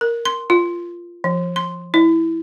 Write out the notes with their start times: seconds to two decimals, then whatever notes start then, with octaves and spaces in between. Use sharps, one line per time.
0.01 A#4
0.25 C6
0.50 F4
1.24 F3
1.56 C6
1.94 E4